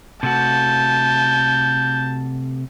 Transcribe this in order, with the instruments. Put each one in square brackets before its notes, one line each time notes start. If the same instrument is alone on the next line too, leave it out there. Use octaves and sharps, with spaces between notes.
[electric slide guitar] C3 A3 F#4 [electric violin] A5 [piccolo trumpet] G6